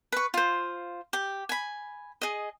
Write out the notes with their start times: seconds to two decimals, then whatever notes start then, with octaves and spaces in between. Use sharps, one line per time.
0.12 B4 C#6
0.34 F4 C5
1.13 G4
1.49 G#5 B5
2.22 G#4 D#5